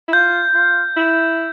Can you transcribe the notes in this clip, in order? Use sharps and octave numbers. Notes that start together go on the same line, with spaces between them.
E4
F4 G6
F4
E4